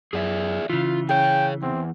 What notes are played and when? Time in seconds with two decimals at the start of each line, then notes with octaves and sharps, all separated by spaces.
0.13 F#2 G#4 D5 E5
0.70 C#3 E3 F4
1.09 G#4 C#5 G5
1.63 E2 C4